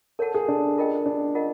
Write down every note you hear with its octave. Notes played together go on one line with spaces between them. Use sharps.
A4 A#4 C#5 F#5 A5
G#4
D4
F4 A#4 D#5 G5
D4
F4 A#4 D#5 F#5